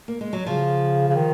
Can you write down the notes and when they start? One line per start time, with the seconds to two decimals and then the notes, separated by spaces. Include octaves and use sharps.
0.08 A#3
0.21 G#3
0.33 F#3
0.46 C#3 F3
1.09 C#3
1.16 D#3